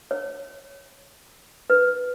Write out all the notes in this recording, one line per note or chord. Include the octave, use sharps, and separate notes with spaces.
C#5
B4